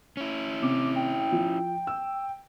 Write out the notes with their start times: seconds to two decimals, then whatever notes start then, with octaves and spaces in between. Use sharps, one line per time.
0.17 C#4 E4
0.62 C3 D6
0.96 G5
1.32 F3
1.87 E6